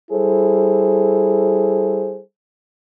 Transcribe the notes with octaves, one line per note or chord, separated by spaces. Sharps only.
G3 E4 G#4 A4 C5